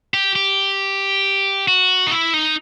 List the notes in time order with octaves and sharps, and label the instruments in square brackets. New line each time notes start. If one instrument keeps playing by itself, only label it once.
[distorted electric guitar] G4
G4
F#4
D#4
E4
D#4